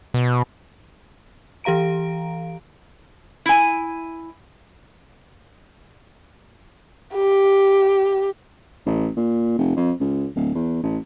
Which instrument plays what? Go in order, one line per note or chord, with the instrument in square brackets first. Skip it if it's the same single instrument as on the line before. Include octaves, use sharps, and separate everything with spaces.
[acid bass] B2
[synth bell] E3 G4 F5 A#5 D7
[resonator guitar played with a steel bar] E4 G#5
[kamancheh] G4
[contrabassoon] A1
A#2
F1
F2
C#2
D1
E2
A1